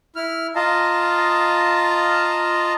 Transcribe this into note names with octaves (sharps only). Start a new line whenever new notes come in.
E4 F6
F4 D#5 F5 A5 A#5